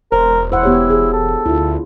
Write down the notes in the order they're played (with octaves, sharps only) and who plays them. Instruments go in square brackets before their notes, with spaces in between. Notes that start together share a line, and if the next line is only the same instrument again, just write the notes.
[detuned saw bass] E1 [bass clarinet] A#4 [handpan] C5
[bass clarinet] E4 [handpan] C5 F#5
[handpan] B3 G4 C#5
G#4
[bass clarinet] A4
[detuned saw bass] D2 [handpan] E4 F4